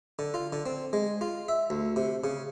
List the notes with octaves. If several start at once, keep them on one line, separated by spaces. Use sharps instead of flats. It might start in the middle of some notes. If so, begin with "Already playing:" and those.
D3
F4
D3
C4
G#3
F4
E5
D2
C3
C#3